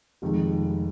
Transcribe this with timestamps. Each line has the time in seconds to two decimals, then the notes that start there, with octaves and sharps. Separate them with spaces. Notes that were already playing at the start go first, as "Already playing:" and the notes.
0.22 F1 F2 D#3 G#3